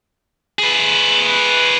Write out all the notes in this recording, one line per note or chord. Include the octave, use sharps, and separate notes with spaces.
G#4 B4